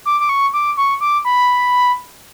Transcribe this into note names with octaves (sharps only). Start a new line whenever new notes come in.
D6
D6
C#6
D6
C#6
D6
B5